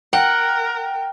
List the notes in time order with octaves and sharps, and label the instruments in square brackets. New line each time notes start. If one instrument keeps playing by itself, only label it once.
[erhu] A#4 [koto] F#5 [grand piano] G5